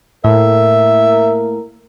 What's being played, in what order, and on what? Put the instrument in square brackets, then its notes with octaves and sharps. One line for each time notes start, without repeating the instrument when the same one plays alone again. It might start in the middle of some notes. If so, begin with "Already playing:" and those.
[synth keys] A2 [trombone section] A#3 A#4 [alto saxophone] E5